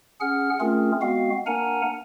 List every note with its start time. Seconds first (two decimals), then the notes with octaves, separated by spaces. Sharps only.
0.21 C#4 G#4 F#5 F6
0.60 A3 C4 C#4 F4 G#4 A#4
1.02 G#3 B3 C4 F#4 F5
1.47 A#3 D4 A#4 F#5 G#5 A#5